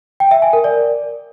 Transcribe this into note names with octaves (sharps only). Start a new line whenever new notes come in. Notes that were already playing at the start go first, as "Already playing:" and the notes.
G5
E5
G#5
A#4
D5